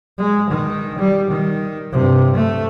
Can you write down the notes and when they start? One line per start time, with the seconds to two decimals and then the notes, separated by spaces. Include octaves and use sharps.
0.18 G#3
0.50 D#3
0.98 G3
1.30 D#3
1.92 G2 C3
2.35 A3